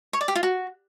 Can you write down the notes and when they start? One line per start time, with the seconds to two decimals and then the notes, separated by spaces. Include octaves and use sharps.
0.13 C#5
0.21 D5
0.28 G4
0.35 F4
0.43 F#4